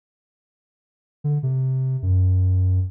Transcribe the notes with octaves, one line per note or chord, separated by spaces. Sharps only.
D3
C3
F#2